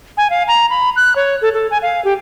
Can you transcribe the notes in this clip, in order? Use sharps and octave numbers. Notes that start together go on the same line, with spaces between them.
G#5
F5
A#5
B5
F#6
C#5
A4
A4
G#5
F5
G4